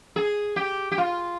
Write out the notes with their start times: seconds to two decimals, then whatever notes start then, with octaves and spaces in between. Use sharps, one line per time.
0.16 G#4
0.56 G4
0.91 G4
0.98 F4